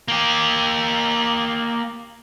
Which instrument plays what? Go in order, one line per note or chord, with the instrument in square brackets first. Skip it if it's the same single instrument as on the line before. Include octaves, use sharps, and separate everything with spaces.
[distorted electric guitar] A#3 G4